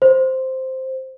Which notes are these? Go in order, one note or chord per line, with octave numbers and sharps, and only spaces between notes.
C5